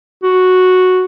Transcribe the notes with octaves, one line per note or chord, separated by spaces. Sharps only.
F#4